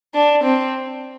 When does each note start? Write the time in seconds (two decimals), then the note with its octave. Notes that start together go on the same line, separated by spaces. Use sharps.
0.15 D4
0.44 C4